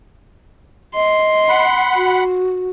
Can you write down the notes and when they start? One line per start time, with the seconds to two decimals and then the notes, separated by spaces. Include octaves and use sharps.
0.95 D#5 C6
1.49 F#5 B5
1.96 F#4